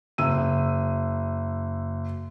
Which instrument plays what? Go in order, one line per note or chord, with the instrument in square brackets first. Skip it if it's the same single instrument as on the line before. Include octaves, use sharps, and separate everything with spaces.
[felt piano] F#1 E6 D#7